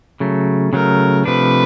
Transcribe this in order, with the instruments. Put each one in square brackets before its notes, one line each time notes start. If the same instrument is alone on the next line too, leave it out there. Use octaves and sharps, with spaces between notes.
[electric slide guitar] C#3 F#3 A3
[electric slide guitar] C#3 F#3 A3 [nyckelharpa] A#4
[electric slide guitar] C3 F3 A3 D4 [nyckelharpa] B4